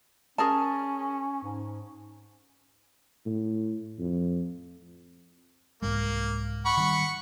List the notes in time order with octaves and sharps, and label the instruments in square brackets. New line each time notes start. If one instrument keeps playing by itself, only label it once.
[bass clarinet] C#4 [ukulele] G#4 A#4 A5
[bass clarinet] G#2
[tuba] A2
F2
[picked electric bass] C2 G#2 G#3 [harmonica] A#3
[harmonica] F#5 B5 C#6
[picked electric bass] D#3 G3